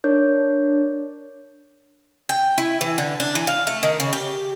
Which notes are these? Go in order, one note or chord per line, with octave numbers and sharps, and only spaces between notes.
D4 A#4 C#5 G6
G5
E4
E3
D3
D4
E3
F5
A3
D#3
C#3
G4